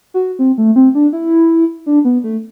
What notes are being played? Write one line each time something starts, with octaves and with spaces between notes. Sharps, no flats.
F#4
C4
A3
C4
D4
E4
D4
B3
A3